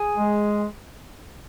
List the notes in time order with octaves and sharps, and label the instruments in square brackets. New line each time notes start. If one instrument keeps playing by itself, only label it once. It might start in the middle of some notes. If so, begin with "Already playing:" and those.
Already playing: [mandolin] G#4
[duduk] G#3